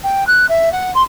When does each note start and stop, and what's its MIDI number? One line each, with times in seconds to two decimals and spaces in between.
0.03 0.26 79
0.27 0.48 90
0.49 0.71 76
0.72 0.91 78
0.94 1.02 84